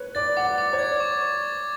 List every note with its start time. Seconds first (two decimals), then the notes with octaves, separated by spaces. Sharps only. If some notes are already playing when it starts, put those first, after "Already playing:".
Already playing: B4 C#5
0.15 D5 A6
0.37 F#5 D6
0.58 D6
0.73 C#5
0.79 D5 G#6
1.00 C#6
1.21 C#6
1.43 A6